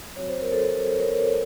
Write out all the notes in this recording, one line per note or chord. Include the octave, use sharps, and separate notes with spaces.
F#3 C4 F#4 C#5
C5
A#4
A4 C5
A#4 C#5